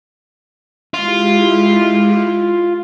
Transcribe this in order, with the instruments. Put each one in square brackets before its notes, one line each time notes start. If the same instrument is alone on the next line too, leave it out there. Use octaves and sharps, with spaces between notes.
[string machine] G#3 E4 G4 [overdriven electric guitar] F4